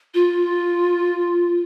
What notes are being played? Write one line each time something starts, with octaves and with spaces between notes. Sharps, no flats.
F4